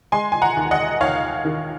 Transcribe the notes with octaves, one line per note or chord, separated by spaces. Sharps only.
G#3 G#5 C6
G#5
F#5 A#5
D#2
D#5 F#5
D#2 C#5 F5
D#3